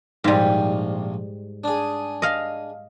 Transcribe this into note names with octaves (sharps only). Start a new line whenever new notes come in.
A#1 G#2 C3 G3 A#3
D4 G#4
D#5 F5